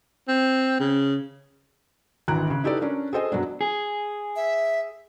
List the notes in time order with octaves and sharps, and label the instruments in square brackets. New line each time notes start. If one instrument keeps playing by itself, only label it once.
[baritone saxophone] C4
C#3
[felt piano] G#1 D2 E3 A#5 F#6 D7
C#3
D#4 E4 G4 A4 B4 D5
C#4 D4 A#4
G#4 A4 C5 D#5 G#5
F#2 F#3 B3 D4
[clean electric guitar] G#4
[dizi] E5